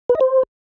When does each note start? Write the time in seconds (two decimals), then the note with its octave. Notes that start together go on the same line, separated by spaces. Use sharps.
0.09 B4
0.15 D#5
0.21 C5